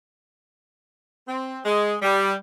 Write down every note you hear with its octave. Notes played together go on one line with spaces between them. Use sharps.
C4
G#3
G3